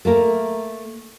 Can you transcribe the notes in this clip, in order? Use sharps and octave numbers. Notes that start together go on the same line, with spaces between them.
A3 A#3 A#4